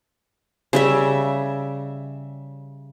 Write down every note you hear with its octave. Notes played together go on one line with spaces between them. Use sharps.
C#3 G3 E5